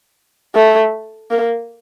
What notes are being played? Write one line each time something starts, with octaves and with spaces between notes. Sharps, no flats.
A3
A#3